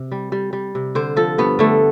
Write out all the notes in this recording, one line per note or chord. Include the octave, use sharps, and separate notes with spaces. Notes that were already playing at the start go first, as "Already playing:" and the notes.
Already playing: C3
G3
G3
G3
C3
D3 C5
F3 A4
G2 B3
D3 A3